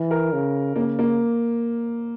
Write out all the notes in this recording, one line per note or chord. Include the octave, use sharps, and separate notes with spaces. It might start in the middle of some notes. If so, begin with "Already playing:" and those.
Already playing: E3
A#4
C#3
C#3 A#3
A#3